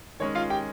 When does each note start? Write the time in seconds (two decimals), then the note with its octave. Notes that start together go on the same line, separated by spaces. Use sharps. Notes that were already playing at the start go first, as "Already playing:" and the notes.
0.20 D#3 G#3 C#4 C#5
0.35 F4 F5
0.50 G4 G5